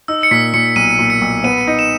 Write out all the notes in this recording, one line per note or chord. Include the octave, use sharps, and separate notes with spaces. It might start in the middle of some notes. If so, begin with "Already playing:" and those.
D#4 E6
C#7
A#2 B6
A#2 C#7
B1 D#7
A#2
C#7
B1
B3 D#7
D#4
E7